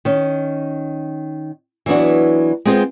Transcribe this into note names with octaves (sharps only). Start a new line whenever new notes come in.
D#3 C#4
E3 F#3 B3 D4 F#4
G#3 B3 C4 F4 G#4 C5